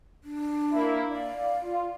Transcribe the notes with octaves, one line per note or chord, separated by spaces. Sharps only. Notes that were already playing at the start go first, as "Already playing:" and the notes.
D4
A#3 E4
D5 F5
F4